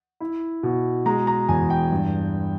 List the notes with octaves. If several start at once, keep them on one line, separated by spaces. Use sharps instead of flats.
E4
B2
G#3 A#5
A#5
E2 G#5
G5
G2